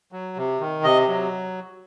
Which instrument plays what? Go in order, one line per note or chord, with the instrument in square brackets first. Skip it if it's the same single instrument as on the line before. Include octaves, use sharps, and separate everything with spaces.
[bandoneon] F#3
C3
D#3
C3 D#5
F#3